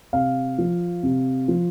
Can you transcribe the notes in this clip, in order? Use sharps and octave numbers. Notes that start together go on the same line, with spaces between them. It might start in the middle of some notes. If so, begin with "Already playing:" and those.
C3 F5
F3
C3
F3